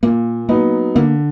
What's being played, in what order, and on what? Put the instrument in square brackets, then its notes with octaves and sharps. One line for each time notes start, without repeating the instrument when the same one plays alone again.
[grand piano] A#2 [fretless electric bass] A#3
[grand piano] F#3 B3 D#4 [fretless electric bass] A#3
[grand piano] D3 [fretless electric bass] A#3